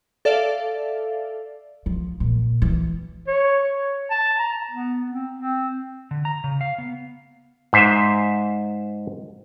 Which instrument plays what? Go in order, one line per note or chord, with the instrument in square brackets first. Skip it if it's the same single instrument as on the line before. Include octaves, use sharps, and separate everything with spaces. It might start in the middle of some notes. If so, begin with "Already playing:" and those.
[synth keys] A4 D5 E5 F5
[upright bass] F3
A#2
E3
[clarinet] C#5
C#5
A5
A#5
B3
C4
C4
[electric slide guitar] D3
A#5
C#3
F5
B3
[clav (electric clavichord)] G#2 C5 E5